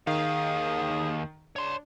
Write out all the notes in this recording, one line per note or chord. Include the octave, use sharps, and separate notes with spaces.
D#2 D#3 G#4 F5
D4 C#5 C6